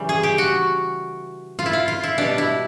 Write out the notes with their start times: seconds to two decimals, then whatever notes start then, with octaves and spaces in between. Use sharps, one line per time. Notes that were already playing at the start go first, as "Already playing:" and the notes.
Already playing: C#3 E3 G3
0.09 G#4
0.23 G4
0.38 F#4
1.59 F4
1.66 E4
1.73 F4
1.88 F4
2.03 E4
2.18 B2 G3 D4
2.38 E4